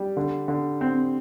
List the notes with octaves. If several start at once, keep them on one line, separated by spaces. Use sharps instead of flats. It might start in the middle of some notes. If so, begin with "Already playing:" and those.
Already playing: G3
D3
D3
C4